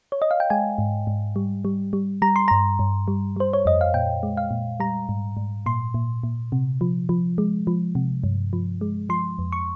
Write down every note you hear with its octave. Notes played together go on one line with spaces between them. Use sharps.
C#5
D#5
F5
G5
G#3 G#5
G#2
G#2
G3
G3
G3
G3 A#5
C6
G2 A#5
G2
G3
G3 C5
C#5
F2 D#5
F5
A#2 G5
G#3
F5
A#2
G3 A#5
G#2
G#2
A#2 C6
A#2
A#2
C3
F3
F3
G#3
F3
C3
G2
F3
G#3
F3 C6
F2
C#6